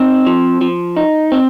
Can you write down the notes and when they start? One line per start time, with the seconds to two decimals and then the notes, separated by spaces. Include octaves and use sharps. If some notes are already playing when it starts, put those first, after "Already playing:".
Already playing: C4 D#4
0.26 F3
0.61 F3
0.97 D#4
1.32 C4